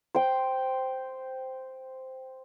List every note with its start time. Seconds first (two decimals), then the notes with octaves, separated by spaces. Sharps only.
0.15 C5 G5